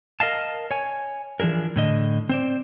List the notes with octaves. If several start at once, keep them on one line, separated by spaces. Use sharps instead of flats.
A#4 D#5 F5 A5
C#5 G#5
E3 F3 D4 G#4 A#4
A2 D3 D#5
C4 C5 D5